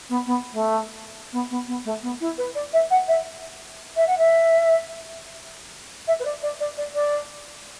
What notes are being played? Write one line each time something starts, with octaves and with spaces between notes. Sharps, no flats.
B3
B3
A3
B3
B3
B3
A3
B3
E4
B4
D5
E5
F#5
E5
E5
F#5
E5
E5
B4
D5
D5
D5
D5
D5